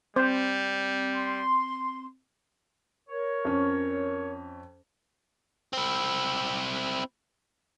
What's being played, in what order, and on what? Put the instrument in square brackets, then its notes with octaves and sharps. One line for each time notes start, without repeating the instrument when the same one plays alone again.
[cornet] G3 [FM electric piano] C4 [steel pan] C5
[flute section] C6
[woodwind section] A#4 C#5
[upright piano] F2 C#4
[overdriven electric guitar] C4 E4